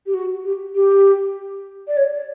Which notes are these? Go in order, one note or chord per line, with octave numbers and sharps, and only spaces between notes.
G4
F#4
G4
G4
D5
C#5
D5